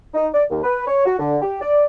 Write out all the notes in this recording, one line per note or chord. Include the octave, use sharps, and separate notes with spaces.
D#4
D5
D#2
B4
C#5
F#4
D3
G4
D5